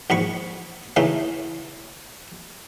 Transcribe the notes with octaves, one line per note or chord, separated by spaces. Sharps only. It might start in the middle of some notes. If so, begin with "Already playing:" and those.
A#1 G#2 B5 C#6
C#3 E3 A3 D#4